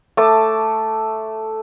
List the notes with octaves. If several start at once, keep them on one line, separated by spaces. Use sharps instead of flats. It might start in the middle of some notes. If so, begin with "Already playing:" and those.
A3 A5 D6